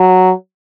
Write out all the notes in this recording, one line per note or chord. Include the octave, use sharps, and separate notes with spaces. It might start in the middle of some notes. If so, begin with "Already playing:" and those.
Already playing: F#3